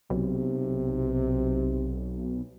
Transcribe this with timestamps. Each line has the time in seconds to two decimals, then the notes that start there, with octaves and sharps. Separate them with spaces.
0.10 B1 C3